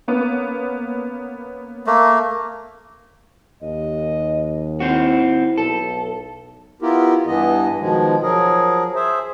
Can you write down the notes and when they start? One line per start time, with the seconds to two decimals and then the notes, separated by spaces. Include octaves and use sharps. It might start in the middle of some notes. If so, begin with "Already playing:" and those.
0.08 A#3 B3 C#4
1.87 A3 A#3
3.62 D#2 D#5
4.80 C4 E4 F#4
5.58 B1 A4
6.82 B3 E4 F4 G4 A#4
7.26 G2 E3 B3 D#5
7.80 B2 D#3 F3 G#3
8.23 F3 F#3 G#4 A#4
8.95 G#4 C5 E5